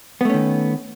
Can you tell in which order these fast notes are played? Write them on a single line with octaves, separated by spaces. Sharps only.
B3 A3 C#4 D#3